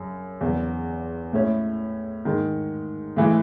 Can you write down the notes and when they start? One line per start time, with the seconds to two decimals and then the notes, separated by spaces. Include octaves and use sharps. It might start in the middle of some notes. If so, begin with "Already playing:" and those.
Already playing: F#2 C#3
0.41 E2 C#3 F#3
1.33 A2 G#3 C#4 E4
2.25 G#2 D#3 G#3
3.16 A2 E3 G#3